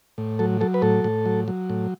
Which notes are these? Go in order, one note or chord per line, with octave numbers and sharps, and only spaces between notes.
A2
F#3 A4
F#3 A4
B4
A2 A4
A2
F#3
F#3
A2